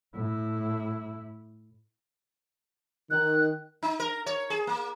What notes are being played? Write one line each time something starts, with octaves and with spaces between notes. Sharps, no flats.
A2 E4
D#3 F#6
D#4
A#4
C#5
G#4
A#3